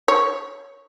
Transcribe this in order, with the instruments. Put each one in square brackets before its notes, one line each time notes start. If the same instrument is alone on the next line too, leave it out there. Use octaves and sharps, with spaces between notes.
[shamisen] C#5